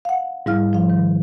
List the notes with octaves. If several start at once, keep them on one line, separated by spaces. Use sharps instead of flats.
F5 F#5
G#2 G3 E4 F5 F6
F3 F5
D#3